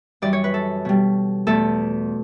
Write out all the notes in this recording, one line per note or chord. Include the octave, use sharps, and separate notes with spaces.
F#2 E3 G3 D5
C#5
B4
A4
B2 G3
E2 B2 A3 A4